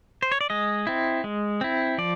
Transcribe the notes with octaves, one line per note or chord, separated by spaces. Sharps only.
C5
C#5
D5
G#3 D#5
C4 E4
G#3
C4 E4
F3 D5